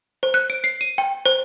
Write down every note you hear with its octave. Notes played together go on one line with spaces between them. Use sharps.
C5
F#6
D7
C7
D#7
G5
C5